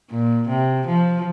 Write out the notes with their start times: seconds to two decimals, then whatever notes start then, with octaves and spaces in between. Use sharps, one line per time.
0.11 A#2
0.49 C3
0.87 F3